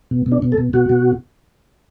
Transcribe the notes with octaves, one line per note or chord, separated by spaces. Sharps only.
B2
B2
D4
B2
A4
B2
B2 F#4
B2